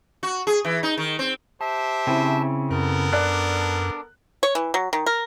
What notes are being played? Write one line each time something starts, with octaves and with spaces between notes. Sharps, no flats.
F#4
G#4
E3
D#4
D#3
C4
G4 C5 E5 A5
C#3 C4 E4
F#2 B3 A4 A#4
D4 D5 F#6
C#5
E3
F#3
D#3
A#4